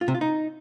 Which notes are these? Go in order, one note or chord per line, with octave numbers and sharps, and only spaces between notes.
F4
C3
F4
D#4